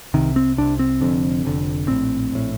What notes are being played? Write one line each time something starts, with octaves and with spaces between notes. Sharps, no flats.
C2 C3 D#3
C4
C2 C3 D4
C4
F1 F2 D3
F1 F2 D3
A#1 A2 C4
A#1 A2